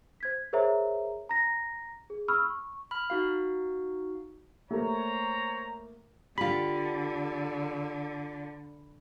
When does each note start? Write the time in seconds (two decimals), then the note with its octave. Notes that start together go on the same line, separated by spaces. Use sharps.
0.20 C5 G#6 B6
0.53 G#4 A#4 C5 C#5 E5 A#5
1.29 A#5 A#6
2.10 G#4
2.28 B5 C#6 E6 F6
2.43 C#6
2.91 B5 F6
3.10 D#4 F#4 F5
4.71 A3 A#3 C5 C#5 A#5
6.38 D3 F4 G4 B5